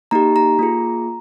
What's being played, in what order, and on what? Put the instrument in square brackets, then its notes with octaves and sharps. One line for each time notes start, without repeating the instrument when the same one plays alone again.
[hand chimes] A#3 D#4 G4 A#5
A#5
A#3 F4 G#4